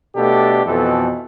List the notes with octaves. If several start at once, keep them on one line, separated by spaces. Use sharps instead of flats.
B2 A3 D4 G4 A4
F2 B2 E3 A4